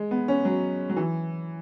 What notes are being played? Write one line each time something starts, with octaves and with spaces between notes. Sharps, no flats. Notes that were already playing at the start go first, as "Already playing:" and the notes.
Already playing: G#3
B3
C#4
F#3
F#3
E3